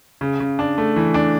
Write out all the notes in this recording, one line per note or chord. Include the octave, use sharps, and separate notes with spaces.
C#3
C#3
D4
A3
E3
D4